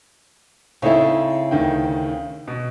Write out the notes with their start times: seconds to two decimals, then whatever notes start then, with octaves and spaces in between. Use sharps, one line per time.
0.82 C#3 C4 D#4 E4 A4
1.51 D2 D#3 G5
2.48 B2